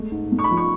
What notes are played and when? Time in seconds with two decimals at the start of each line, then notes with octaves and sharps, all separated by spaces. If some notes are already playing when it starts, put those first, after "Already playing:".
Already playing: G#3 A3
0.12 G#2
0.32 A3
0.39 C#6
0.44 B5
0.51 F3
0.57 C#6